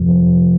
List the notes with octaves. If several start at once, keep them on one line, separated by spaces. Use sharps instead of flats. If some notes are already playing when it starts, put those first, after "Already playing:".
Already playing: F2 C3 F3